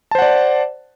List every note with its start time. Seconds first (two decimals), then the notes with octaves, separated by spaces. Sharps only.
0.11 A5
0.15 C5
0.18 F#5
0.22 D5